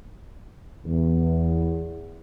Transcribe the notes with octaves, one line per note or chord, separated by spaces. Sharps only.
E2